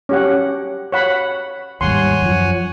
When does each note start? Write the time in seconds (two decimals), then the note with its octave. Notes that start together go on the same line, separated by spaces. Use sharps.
0.09 C#4 G4 F#5
0.92 C#5 F#5 B5
1.81 D#2 G#2 G3 C#5 F#5 G#5 C6
2.22 F#2 F3